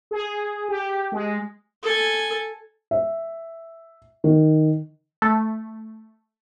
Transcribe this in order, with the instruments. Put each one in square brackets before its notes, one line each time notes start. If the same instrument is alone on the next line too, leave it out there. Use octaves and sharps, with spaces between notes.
[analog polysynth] G#4
G4
G#3
[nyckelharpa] A4 G#5
[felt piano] E5
D#3
[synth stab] A3